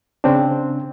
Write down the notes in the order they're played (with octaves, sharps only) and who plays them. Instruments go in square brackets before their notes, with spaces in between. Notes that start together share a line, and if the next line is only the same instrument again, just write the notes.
[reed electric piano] C#3 C4 D4